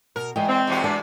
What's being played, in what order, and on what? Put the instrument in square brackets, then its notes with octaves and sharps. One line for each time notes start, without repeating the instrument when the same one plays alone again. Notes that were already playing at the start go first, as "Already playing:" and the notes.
[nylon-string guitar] B2 [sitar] A#4
[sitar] E2 [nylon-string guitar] G#3 D#5 G5
[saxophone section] C4
[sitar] E2 C3 F#4
[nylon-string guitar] G#3 B4 [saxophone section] D4